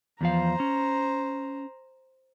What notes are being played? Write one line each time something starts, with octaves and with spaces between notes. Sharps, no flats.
E2 F3 C5 F5 A#5
C#4